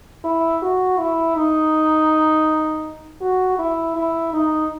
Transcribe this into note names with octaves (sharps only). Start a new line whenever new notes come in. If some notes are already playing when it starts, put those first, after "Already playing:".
E4
F#4
E4
D#4
F#4
E4
E4
D#4